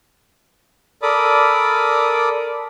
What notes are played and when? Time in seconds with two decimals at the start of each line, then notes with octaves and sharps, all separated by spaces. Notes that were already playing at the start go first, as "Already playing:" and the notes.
1.02 A4 A#4 D5 B5 D6 D#6